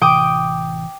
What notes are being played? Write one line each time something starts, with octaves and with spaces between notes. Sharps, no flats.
A1 C3 E3 G5 D6 D#6